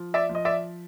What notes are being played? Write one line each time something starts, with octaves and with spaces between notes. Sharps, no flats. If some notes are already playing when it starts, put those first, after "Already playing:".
Already playing: F3
D5 E5
F3
D#5
D5 E5